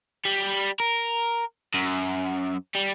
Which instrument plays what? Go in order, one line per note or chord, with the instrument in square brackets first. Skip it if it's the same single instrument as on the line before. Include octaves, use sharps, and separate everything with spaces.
[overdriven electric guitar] G3
A#4
F#2
G3